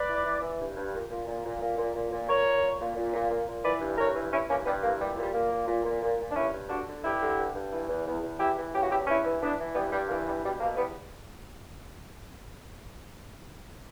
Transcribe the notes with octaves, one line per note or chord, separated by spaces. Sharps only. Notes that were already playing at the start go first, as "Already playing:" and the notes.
Already playing: B4 D5
E3
E3
E3
G2
G2
A#2
A#2
A#2
A#2
A#2
A#2
A#2
A#2
A#2 A#4 C#5
A#2
A#2
A#2
A#2
A#2
A#2
A#2
E3 B4 D5
G2
G2 A#4 C#5
E3
E3 C#4 E4
G2 A#3 C#4
G2 G3 B3
E3 A#3
A#2 G3
A#2 G3
A#2 A#3
A#2
A#2
A#2
A#2
A#2
D4
G2 C#4 E4
G2
D3 D4 F#4
D3
G2 E4 G4
D3
G2
G2
E3
E2
E2
E2
E3 E4 G4
E3
C#3 G4
F#4
E2 E4 G4
G2 C#4 E4
E3
E3 B3 D4
E3
G2 G3 B3
G2 G3
E3 A#3
G2 G3
B2 G3
B2 A#3
E2 G3 B3